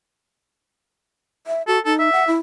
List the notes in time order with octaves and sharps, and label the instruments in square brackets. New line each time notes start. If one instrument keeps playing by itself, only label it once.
[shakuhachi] E5
[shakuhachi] F#4 [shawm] A4
[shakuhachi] D#4 [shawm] A4
[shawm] E5
[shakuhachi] F#5
E4